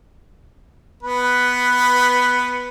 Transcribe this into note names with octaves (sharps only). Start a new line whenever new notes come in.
B3 B4